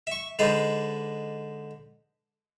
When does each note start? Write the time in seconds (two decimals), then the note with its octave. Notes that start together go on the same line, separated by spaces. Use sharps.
0.07 E5 C#6
0.39 D3 G#3 D#4 B4 C5 D5